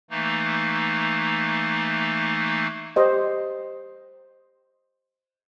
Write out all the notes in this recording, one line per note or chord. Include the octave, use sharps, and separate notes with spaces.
E3 A3 A#3 D#4
G4 C5 D#5